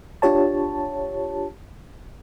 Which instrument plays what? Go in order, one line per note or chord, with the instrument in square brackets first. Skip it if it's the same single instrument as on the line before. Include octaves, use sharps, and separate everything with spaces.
[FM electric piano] D4 F4 G4 C#5 A5